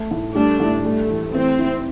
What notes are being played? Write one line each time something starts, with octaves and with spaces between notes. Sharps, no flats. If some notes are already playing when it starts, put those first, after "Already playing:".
Already playing: A3
A2
G3 A3 D4
A2
G3 A3
E3
E3 C4
E4